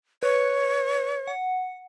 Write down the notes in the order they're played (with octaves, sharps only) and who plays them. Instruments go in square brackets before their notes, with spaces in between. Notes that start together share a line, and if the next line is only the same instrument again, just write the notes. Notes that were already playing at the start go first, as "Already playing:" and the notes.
[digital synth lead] B4 [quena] C#5
[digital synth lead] F#5